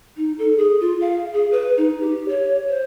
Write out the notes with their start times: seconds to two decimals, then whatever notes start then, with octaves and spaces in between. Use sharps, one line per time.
0.17 D#4
0.39 A4
0.57 G#4
0.80 F4
1.01 F5
1.33 G#4
1.52 B4
1.77 D#4
2.01 G4
2.29 C#5
2.69 C5